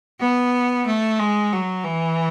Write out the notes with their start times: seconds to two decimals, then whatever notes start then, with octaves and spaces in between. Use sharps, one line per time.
0.20 B3
0.87 A3
1.19 G#3
1.53 F#3
1.85 E3